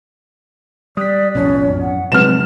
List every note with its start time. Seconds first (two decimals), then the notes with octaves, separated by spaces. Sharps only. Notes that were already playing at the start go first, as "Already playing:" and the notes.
0.97 G3 D5 D#6 F#6 B6
1.35 B1 F2 A2 C#4
1.68 F#2
1.81 F#5
2.12 F1 F#3 G#3 C4 B4 F6 E7